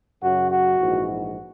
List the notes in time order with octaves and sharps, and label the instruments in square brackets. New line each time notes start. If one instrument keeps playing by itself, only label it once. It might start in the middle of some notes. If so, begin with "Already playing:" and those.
[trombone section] F#2 C#3 F#3 F#4
F#4
A#1 G#2 E3